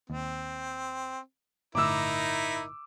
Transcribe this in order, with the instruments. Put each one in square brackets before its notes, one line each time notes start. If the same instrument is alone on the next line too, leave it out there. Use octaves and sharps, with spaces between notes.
[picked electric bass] D#2 [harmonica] C4
[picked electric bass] G1 A2 D3 [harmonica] D#4 E4 A#4 [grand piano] D6 E6